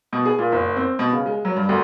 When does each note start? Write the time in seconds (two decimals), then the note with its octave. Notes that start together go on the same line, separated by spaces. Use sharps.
0.13 B2
0.25 G#4
0.39 A#2
0.52 F#1
0.76 C4
0.99 B2
1.13 C#3
1.26 G#3
1.45 F#3
1.56 G2
1.69 D2